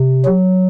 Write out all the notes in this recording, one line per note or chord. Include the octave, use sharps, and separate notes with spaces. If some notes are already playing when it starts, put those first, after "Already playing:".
Already playing: C3
F#3